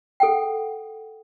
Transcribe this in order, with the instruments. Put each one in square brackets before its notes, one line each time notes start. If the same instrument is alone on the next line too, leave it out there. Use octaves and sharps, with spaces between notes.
[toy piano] A4 F#5 G5